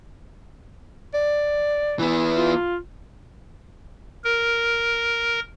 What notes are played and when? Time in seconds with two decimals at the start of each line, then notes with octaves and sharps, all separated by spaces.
1.14 D5
1.99 E3 B3
2.37 F4
4.24 A#4